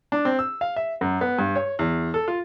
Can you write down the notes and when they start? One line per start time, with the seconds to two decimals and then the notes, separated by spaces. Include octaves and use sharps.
0.12 D4
0.25 C4
0.39 E6
0.61 F5
0.76 E5
1.01 F#2
1.21 B3
1.38 G2
1.56 C#5
1.79 E2
2.14 A4
2.28 F4